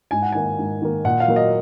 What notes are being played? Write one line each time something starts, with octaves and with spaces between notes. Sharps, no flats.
G#2 G#5
F#5
D#3 A#3 G#5
G#2
D#3 A#3
A#2 F#5
F5
F#3 A#3
D#5